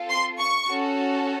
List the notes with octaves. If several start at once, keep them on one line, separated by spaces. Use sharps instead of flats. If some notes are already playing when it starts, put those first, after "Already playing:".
Already playing: C4 F4 A4
C6
C#6
C#4 F#4 A4